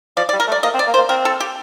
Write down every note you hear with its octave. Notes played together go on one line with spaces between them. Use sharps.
F3 D5
D5
G3
A#4
A3
D5
A#3 D#5
C4
D5
A#3
C5
A#3
C4 A#4
A4
G4